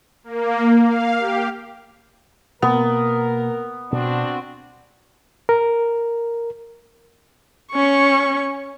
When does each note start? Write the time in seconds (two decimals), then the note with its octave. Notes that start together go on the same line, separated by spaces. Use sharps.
0.24 A#3
0.81 F5
1.18 G4
2.62 B2 A#3 B3 A#4
3.92 B2 C4 D4 F#4
5.49 A#4
7.72 C#4 C#6